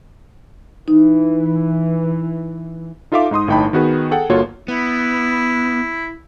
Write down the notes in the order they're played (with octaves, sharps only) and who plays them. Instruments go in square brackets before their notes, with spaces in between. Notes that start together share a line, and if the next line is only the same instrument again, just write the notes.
[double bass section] E3 [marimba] D#4
[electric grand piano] D#4 F4 A4 E5 F5 D6
G#2 D#4 C6 D#6
G1 A2 D#4 G5 A5 B5
D#3 B3 F#4 G#4 B4
G#4 A4 F#5 G5
G1 A#3 F4 F#4 A4 C#5
[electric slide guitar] B3 [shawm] E4